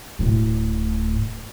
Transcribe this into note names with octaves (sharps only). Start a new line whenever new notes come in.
D1 A2